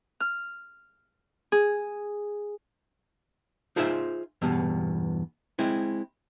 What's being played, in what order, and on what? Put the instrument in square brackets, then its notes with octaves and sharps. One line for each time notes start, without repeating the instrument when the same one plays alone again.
[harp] F6
G#4
[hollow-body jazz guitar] D#4 F4 G#4 C5 E5
E2 G2 B2
G#3 C4 E4